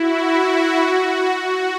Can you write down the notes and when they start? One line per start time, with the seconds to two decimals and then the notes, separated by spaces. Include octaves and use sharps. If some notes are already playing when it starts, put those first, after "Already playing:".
Already playing: E4 F#4
0.20 F#4
1.33 F#4